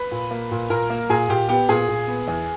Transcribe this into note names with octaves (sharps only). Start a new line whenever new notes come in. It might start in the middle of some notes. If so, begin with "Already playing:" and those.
Already playing: B4 B5
A#2
A#3
A#2
A#2 A#4 A#5
A#3
A#2 G#4 G#5
A#2 G4 G5
B3 G4 G5
A#2 G#4 G#5
A#2
B3
E2